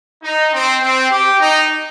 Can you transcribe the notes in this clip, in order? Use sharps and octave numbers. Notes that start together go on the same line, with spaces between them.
D#4
C4
C4
G4
D#4